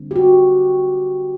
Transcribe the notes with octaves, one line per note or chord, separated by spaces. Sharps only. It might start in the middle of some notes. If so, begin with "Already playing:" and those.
Already playing: D3 G3 C4
G4
F#4